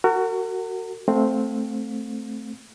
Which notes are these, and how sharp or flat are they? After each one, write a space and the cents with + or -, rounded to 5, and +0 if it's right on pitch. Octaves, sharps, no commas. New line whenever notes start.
F#4 +15 A#4 -40
A3 +0 C4 +0 F5 +35